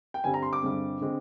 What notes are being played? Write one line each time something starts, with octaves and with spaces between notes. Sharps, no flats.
G5
G2 D3 G3 C4 G#5
A#5
C6
D6
G2 D3 G#3 C4
D3 G#3 C4